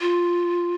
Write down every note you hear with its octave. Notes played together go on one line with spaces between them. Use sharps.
F4